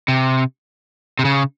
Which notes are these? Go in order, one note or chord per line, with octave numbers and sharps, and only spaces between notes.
C3
C3
C#3